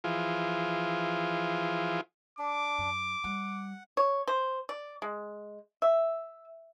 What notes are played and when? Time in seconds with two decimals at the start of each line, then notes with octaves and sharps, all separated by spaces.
0.04 E3 F3 F4 G#4
2.39 D4 D6
2.78 F#2
3.24 G3 F#5
3.97 C#5
4.27 C5
4.69 D5
5.02 G#3
5.82 E5